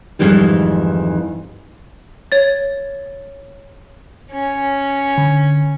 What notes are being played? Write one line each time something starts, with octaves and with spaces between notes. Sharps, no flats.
F2 G#2 D#3 E3 G3
C#5 A6
C#4
D3